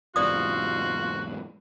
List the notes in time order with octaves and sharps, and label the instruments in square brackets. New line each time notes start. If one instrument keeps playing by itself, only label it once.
[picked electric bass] E2 G#2 C3 [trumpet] F4 [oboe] F#4 [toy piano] D5 D#6